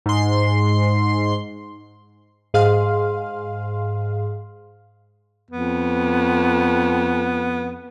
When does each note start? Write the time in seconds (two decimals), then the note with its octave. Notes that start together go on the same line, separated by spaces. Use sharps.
0.06 G#2 C6
2.54 G#2 G#4 F5 C6 F6
5.51 F2 B3